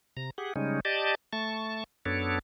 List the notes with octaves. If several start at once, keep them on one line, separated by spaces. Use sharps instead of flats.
C3 A#5
G4 G#4 F#5
C#3 G3 G#3 C#4 D#4
G4 D5 D#5 A5
A3 A5 C#6
F#2 B3 D4 A4 C#5